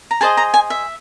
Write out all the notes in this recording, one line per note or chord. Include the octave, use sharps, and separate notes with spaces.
A#5
G#4 C5 D#5 A5
A#5
G#5
E5